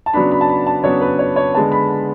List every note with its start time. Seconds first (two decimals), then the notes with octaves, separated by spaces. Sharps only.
0.06 A5
0.13 C#3 F#3 B3 D4 B5
0.32 B5
0.41 A5
0.49 B5
0.67 A5
0.84 C#3 F#3 B3 D4 C#5
1.01 B4
1.19 C#5
1.36 C#5
1.55 D3 G#3 B3 A5
1.72 B5